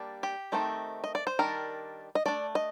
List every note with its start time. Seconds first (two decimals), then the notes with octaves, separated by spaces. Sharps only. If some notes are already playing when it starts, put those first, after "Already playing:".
Already playing: G3 A#3 D4
0.23 G4
0.52 D#3 A3 C4 D#4
1.04 D#5
1.15 D5
1.27 C5
1.39 D#3 G3 D4 A#4
2.15 D#5
2.26 A3 D4 D5
2.55 D#5